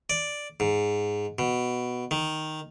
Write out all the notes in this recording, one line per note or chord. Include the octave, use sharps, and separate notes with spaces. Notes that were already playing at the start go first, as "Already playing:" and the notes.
D5
G#2
B2
D#3